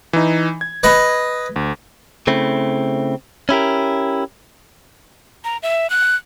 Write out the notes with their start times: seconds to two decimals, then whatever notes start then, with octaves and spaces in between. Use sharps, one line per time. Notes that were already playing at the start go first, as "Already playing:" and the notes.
0.13 E3 D#4
0.61 G#6
0.83 B4 D#5
1.56 D2
2.27 C#3 A3 C4 E4
3.49 C#4 E4 G4 A#4
5.44 A#5
5.63 E5
5.90 F#6